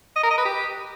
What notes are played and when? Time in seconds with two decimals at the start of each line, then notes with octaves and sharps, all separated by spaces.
0.16 D#5
0.23 A#4
0.30 D#5
0.38 B4
0.45 G4